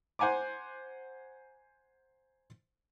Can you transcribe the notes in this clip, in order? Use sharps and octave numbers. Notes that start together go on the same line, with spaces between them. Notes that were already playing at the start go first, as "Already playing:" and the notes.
C5 F#5 G#5 A#5 D6